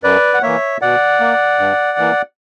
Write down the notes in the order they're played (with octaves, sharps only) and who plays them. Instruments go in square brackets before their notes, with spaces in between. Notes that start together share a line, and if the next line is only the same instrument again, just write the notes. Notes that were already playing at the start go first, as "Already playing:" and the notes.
[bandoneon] F#2 B4 D5
F#5
E3 A#3 C#5 E5
B2 D5 F#5
A#3
G2
E3 A#3